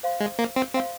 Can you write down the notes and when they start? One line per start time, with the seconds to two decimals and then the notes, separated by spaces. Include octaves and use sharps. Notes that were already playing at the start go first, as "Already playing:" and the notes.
0.03 C5 F5 C6
0.20 G#3
0.39 A#3
0.56 C4
0.74 C4 C5 F5 C6